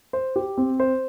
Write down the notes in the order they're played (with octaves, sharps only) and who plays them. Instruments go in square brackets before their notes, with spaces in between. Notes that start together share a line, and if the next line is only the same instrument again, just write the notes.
[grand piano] C5
G4
C4
C5